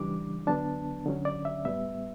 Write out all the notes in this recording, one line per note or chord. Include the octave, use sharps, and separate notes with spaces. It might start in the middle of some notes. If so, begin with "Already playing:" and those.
Already playing: C#3 E3 G3 D4 D6
D3 F#3 B3 D4 A5
D3 F#3 C#4
D5
E5
A2 G3 B3 E5